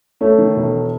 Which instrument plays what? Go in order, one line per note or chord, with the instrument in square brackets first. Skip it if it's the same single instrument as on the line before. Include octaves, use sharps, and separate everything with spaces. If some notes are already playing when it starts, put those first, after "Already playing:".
[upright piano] A3 [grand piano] A4 C#5
[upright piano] D#3
E1